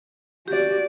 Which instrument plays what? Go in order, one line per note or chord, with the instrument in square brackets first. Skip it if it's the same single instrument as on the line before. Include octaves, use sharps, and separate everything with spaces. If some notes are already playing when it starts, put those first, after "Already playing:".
[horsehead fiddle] F#4 D5 [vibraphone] G4